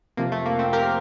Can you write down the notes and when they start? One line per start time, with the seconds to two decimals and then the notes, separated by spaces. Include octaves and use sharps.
0.17 F2 C3 F3 A#3
0.32 A3
0.46 A#3
0.59 A3 C4
0.73 G4 A#4